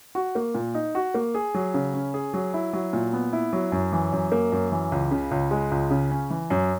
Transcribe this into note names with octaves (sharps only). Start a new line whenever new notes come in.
F#4
A#3
A#2
D#4
F#4
A#3
G#4
F#3
C#3
C#4
G#4
F#3
E4
F#3
A#2
B3
E4
F#3
F#2
E3
F#2
A#3
F#2
E3
C#2
C#3
C#2
G#3
C#2
C#3
C#4
E3
F#2